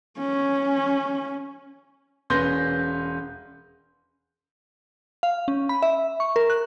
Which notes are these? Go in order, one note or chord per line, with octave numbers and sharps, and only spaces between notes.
C#4
E1 C#4 B4 C6 G6 A#6
F5
C#4
B5
E5
C#6
A#4
F#6